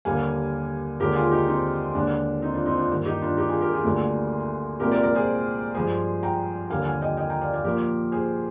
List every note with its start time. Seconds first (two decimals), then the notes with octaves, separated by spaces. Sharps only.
0.05 D#2 D3 G3 A#3 F5 G#5
1.00 D#2 D3 G#3 G4 A#4
1.15 F4 G#4
1.31 D#4 G4
1.48 C4 D#4
1.95 D#2 D3 G#3 D4
2.42 C4 D#4
2.54 D4 F4
2.66 C4 D#4
2.78 D4 F4
2.91 G2 D#3 A#3
3.06 D#4 G4
3.21 D4 F4
3.37 D#4 G4
3.49 F4 G#4
3.61 G4 A#4
3.73 F4 G#4
3.84 D2 D3 G3 A#3
4.80 C2 A#2 G#3 G4 A#4
4.92 A#4 D5
5.03 A#4 D5
5.15 G#4 C5
5.75 G2 F3 G#3 G#4 C5
6.23 G5 A#5
6.70 D#2 D3 G3 A#3 F5 G#5
6.85 F5 G#5
7.01 D#5 G5
7.17 D#5 G5
7.30 G5 A#5
7.42 D5 F5
7.53 D5 F5
7.64 A#2 F3 A#3 G4 A#4
8.12 G#4 C5